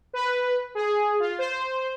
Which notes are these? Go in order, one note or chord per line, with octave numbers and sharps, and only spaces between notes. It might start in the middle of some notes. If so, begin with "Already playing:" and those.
B4
G#4
F4
C5